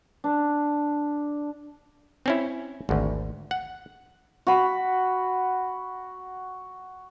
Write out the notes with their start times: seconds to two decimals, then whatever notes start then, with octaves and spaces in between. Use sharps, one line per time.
0.24 D4
2.26 C4 C#4 E4
2.89 G#1 D2
3.51 F#5
4.47 F#4 B5